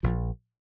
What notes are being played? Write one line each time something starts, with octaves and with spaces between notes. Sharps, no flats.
A#1 F3